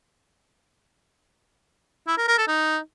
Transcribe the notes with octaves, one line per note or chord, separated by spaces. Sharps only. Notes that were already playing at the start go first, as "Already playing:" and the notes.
E4
A#4
A#4
A4
D#4